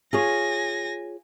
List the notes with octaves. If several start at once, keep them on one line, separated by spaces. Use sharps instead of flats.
F4 G#4 C#5 G#5 A#6